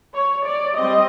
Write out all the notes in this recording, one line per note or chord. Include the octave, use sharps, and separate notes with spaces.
C#5
D5
G3 C4 D#5